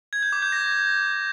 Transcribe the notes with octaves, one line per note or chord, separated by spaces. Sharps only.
G#6
G6
D6
G6
A#6